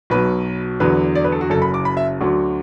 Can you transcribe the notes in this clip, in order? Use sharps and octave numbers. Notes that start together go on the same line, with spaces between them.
B1 B2 F#3 B4
E2 D3 F#3 B4
D5
B4
A4
F#4
F#1 F#2 F#3 A4
B5
D6
B5
E5
D2 D3 F#3